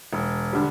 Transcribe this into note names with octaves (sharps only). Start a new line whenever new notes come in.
E1
D3 G3